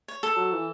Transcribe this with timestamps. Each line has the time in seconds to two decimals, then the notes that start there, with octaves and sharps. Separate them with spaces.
0.08 C#5
0.23 A4
0.37 F#3
0.52 E3